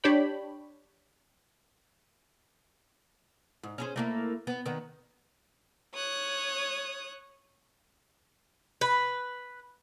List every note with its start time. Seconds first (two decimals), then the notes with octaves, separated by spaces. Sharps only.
0.04 D4 G4 C#5 G5 B5
3.63 G#2
3.78 C#4 G#4 C5
3.96 A3 A#3 E4
4.47 B3
4.66 D#3 B3
5.94 C#5 D#6 F#6
8.81 B4